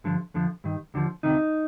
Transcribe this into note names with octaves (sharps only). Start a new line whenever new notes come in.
G2 D3 F3
F2 D3 F3
G2 D#3
D#2 D3 F3
D2 C3 D#3 D#4